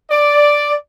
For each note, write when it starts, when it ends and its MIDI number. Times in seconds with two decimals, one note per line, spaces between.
0.11 0.74 74